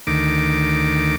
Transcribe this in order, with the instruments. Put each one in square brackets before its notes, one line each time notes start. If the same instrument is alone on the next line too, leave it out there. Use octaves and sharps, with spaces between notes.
[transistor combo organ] D2 D#3 D6